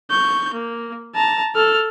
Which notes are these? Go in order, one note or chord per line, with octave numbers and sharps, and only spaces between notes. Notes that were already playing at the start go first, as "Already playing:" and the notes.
C#6 G6
A#3
A5 A#5
A4 F6